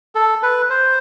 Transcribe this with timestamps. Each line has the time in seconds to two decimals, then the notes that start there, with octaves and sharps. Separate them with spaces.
0.15 A4
0.43 B4
0.70 C5